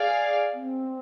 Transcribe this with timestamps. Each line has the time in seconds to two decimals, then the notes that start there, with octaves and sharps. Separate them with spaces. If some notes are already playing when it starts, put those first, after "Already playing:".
Already playing: G#4 D5 F5
0.53 C4